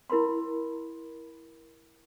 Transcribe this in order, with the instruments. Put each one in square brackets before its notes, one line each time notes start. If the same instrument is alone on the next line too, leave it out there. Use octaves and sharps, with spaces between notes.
[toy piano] E4 A#4 B5 C6